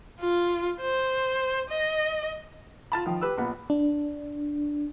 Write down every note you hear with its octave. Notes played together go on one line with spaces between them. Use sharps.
F4
C5
D#5
F4 A5 B5
D#3 F3 F4
G4 B4 E6
A#1 B3
D4